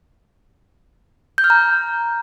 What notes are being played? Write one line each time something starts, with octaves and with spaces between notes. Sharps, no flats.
G6
F6
A#5